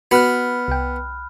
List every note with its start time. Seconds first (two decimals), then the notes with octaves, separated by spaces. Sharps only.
0.11 B3 F#4 B4 B5 F6 F#6
0.68 C2 G5